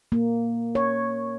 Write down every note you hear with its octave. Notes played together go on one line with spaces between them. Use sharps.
A#3
C#5